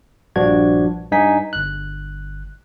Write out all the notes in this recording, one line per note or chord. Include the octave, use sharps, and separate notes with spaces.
A#1 G2 F3 D4 F#4 G#6
G2 D#4 G#5 B6
G1 F#6